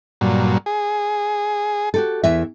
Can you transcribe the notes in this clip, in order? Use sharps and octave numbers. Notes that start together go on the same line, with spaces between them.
G2 A#2 F#3
G#4
F#4 G4 A4
E2 E3 E5